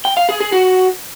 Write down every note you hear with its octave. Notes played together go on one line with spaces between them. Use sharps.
G5
F5
G#4
G#4
F#4